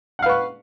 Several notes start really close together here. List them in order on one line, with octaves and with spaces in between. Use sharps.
F#5 F5 B4 C#6